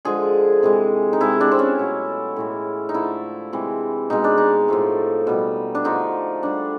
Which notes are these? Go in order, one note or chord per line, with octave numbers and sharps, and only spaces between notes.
D3 F3 G#3 G#4
C3 E3 G#3
D#4
C3 D#3 G#3 E4
D4
C4
C#4
B2 F#3 A3
A2 E3 G#3
D#4
D3 F3 A3 E4
C3 E3 G#3
B2 G#3 D#4
D4
D#4
A2 F3 A3
B2 G3
D4
D3 F3 A3 D#4
D3 G3 D4